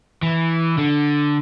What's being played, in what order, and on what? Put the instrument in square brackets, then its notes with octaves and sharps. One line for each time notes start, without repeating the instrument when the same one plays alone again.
[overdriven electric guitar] E3
D3